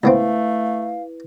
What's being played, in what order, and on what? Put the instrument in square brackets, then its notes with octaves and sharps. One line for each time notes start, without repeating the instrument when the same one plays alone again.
[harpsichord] C#2 B3 C4 [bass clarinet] A3 [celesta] E4 B4 [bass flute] F5